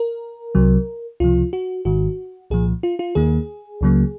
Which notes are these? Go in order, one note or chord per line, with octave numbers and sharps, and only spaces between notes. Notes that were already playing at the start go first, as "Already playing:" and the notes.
Already playing: A#4
C2 C3 F#3
C#2 C3 F3 F4
F#4
G#1 G#2 D#3 F#4
C2 A#2 F3 G#4
F4
F4
D#2 D#3 A#3 G#4
C#2 C#3 F#3 A#3